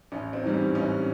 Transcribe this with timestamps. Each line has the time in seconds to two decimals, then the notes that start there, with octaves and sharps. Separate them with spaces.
0.12 A1 C#4
0.33 C4
0.44 G#2 E3 G3
0.54 C#4
0.75 A1 C#4